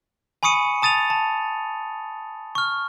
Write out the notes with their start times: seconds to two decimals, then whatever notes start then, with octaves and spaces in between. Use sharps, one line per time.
0.43 G#5 B5 C#6 D#6 C#7 D#7
0.82 A5 D#6 A6 D#7 F7
1.10 A5
2.55 C#6 F6